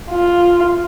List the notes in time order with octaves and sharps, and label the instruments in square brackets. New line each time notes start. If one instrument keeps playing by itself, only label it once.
[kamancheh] F4